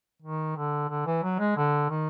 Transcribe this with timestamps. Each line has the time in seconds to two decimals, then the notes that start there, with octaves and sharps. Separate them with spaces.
0.22 D#3
0.56 D3
0.89 D3
1.06 E3
1.23 F#3
1.39 G#3
1.57 D3
1.90 D#3